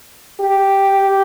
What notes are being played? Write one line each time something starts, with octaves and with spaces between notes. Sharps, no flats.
G4